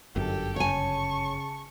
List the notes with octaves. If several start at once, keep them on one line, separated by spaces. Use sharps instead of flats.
G1 F#2 G4 A4
C#3 C#5 G#5 A5 C#6